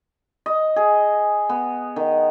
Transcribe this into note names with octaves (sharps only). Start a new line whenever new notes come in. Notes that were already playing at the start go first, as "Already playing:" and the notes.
D#5
G#4
B3
D#3